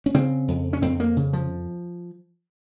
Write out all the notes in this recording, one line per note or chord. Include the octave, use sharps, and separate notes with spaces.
C#4
C#3 C4
F2
C#4
F2 C4
A#3
C#3
F3